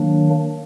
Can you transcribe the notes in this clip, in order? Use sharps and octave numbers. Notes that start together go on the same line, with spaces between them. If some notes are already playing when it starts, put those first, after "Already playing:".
Already playing: D#3 F#3 A#3 D4